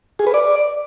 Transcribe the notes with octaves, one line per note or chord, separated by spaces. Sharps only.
G#4
B4
D5